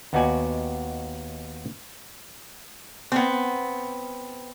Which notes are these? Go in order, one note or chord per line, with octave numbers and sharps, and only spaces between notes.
D#2 B3 D#4 F#4 D5 G#5
B3 C4